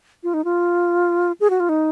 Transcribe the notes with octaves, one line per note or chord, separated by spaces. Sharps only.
F4
D#4
F4
G#4
F#4
F4
D#4